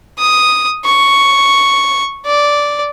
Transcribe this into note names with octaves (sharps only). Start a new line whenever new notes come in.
D#6
C#6
D5